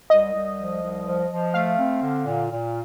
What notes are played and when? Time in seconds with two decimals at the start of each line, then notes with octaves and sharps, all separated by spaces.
0.10 C2 D#5
0.34 C2
0.58 F3
0.82 C2
1.06 F3
1.31 F3
1.54 A3 F5
1.78 C4
2.02 D3
2.26 A#2
2.50 A#2